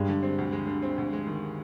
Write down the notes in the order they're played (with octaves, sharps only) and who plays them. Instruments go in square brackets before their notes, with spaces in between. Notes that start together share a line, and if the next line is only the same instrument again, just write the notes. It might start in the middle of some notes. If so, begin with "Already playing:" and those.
Already playing: [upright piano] G2 [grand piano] G#3
[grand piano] D3
C4
D2
G#3
D3
C4
D2
G#3
D#3